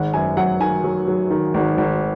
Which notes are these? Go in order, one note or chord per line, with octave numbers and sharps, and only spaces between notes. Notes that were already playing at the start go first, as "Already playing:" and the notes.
Already playing: G#1 F#5
F#2 G#5
F#3 F#5
D#3 G#5
F#3
F#3
D#3
G#1
G#1